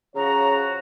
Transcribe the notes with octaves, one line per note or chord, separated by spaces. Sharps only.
C#3 F3 F#4 C#5 A#5